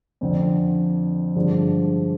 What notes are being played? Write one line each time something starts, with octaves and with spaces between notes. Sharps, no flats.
F2 D3 F3 C4
G2 D3 F3 G#3 D4